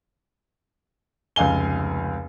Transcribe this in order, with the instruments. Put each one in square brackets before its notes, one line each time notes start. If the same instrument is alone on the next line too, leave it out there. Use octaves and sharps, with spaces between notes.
[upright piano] F1 C#2 F5 G#5 G7